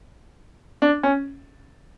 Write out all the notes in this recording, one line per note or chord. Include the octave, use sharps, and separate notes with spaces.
D4
C#4